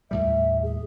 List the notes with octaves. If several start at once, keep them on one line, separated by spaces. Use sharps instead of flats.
D#2 A2 G3 E5
G#4